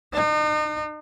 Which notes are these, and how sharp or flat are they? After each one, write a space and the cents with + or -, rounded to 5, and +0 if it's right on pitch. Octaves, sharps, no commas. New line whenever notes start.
D#4 -40